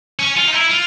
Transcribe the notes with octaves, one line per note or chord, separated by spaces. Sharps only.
C#4
F4
D#4
E4
F4